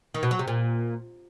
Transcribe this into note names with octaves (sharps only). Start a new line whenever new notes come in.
D#3
B2
F#3
C3
A#2